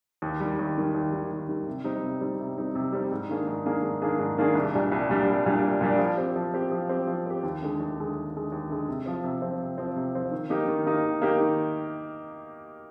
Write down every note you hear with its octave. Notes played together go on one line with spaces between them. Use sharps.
D#2
D#3 G3
D#2
D#3 G3
D#2
D#3 G3
D#2
D#3 G3
C3
G3 C4 D#4
C3
G3 C4 D#4
C3
G3 C4 D#4
C3
G3 C4 D#4
G#2
D#3 A#3 D4 G#4
G#2
D#3 A#3 D4 G#4
G#2
D#3 A#3 D4 G#4
G#2
D#3 A#3 D4 G#4
C2
A#2 G3 D4
C2
A#2 G3 D4
C2
A#2 G3 D4
C2
A#2 G3 D4
F3
C4 G4
F3
C4 G4
F3
C4 G4
F3
C4 G4
D#2
D3 G#3
D#2
D3 G#3
D#2
D3 G#3
D#2
D3 G#3
C3
F3 C4
C3
F3 C4
C3
F3 C4
C3
F3 C4
D#3
A#3 D#4 G4
D#3
A#3 D#4 G4
D#3
A#3 D#4 G4
D#3